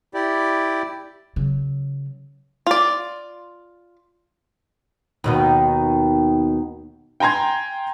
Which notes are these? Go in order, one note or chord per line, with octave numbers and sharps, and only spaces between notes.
E4 G4 D5
C#3 F#3
F4 D5
D#2 B2 D#3
G5 G#5 A#5 C6 G#6